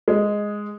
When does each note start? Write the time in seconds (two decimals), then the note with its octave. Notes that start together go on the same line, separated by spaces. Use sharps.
0.08 G#3